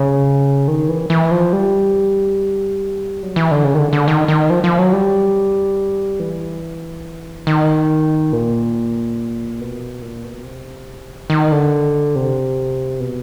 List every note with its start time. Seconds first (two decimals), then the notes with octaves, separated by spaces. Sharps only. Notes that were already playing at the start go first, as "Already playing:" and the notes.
Already playing: C#3
0.68 D#3
0.89 E3
1.10 E3
1.31 F3
1.53 G3
3.23 F#3
3.36 E3
3.51 D3
3.64 C#3
3.74 D#3
3.79 D3
3.93 D3
4.08 D#3
4.28 D#3
4.50 F3
4.64 F3
4.79 F#3
4.93 G3
6.20 E3
7.47 D#3
8.33 A#2
9.61 B2
10.02 A#2
10.24 B2
10.44 C3
11.30 D#3
11.52 D3
12.15 C3
13.00 B2